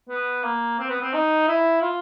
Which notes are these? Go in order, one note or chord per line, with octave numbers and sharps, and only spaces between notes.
B3
A#3
C4
B3
C4
D#4
E4
F4